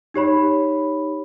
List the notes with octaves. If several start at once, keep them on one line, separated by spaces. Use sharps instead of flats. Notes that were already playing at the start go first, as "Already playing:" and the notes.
D#4 G4 C#5 B5